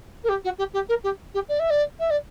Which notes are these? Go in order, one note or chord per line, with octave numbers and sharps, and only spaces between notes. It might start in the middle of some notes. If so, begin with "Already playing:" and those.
A#4
G4
F#4
G4
G4
A#4
G4
G4
D5
E5
D5
E5
D5